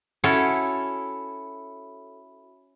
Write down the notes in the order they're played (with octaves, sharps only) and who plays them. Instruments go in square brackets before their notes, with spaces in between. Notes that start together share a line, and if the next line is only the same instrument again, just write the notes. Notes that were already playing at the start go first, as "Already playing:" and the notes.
[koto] C#4 E4 F#4 A4 C#5